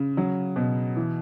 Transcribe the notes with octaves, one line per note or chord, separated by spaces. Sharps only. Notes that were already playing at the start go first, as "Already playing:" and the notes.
Already playing: C#3
F#3
B2
E3